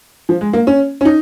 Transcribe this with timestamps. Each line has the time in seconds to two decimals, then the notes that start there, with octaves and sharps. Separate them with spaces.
0.29 F3
0.41 G#3
0.53 A#3
0.67 C#4
1.01 C#4
1.05 D#4